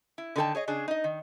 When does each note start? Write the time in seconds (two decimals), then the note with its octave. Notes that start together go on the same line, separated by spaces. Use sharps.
0.18 E4
0.36 D3 D#3 B3 A4 G5 A5
0.55 G#4 C#5 D#5
0.68 C#3 D4 G#4
0.88 D#4 D#5
1.04 D#3